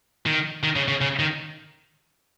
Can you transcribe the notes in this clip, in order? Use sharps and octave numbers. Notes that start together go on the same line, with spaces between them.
D#3
D#3
C#3
C#3
C#3
D#3